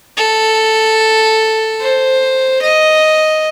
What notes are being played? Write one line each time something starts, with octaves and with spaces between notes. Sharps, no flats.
A4
C5
D#5